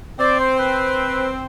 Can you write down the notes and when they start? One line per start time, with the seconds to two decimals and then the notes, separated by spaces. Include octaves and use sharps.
0.19 C4 D5
0.40 C5
0.59 B4